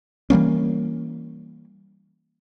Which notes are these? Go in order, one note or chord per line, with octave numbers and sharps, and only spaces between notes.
E3 G3 A#3 C#4